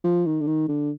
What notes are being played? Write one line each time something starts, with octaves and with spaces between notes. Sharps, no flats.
F3
D#3
D3
D#3
D3